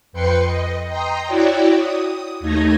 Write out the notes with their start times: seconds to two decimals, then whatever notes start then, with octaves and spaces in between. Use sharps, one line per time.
0.13 F2 B4 G5 C6 C#7
0.47 D#5
0.88 G5 A#5 C6 D#6
1.26 E4 F#4 C#5 D5 G5
1.76 D#6
2.40 D#2 A3 D#4 G#6 A#6